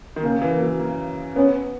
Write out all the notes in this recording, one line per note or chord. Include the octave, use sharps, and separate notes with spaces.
D#3
C#3 A#3
E3
F#3
A#3
B3 C#4